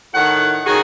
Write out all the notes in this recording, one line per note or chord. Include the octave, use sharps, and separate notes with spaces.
A2 D#3 F#5
D#3 C#4 F#4 G#4